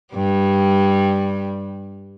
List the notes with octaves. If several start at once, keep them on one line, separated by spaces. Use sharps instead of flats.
G2 G3